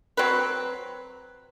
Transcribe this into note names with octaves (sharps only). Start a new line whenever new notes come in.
F#3 C4 F#4 B4